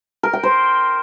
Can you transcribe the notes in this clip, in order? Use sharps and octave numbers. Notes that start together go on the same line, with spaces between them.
A#4
G5
C5